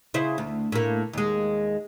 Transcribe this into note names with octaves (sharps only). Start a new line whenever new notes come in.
C#3 E4 C5
D2
A2 A#3
D#2 G#3